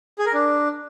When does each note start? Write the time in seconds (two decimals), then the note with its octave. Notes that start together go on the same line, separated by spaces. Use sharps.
0.19 G#4
0.26 A#4
0.33 D4